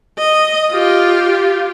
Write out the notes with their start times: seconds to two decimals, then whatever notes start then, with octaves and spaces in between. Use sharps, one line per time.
0.18 D#5
0.72 F4 G4